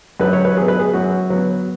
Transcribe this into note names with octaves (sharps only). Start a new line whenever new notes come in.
F#2 B4
C#5
B4
F#3 B3 G#4
B4
G#4
F#2 F#4
F#3 B3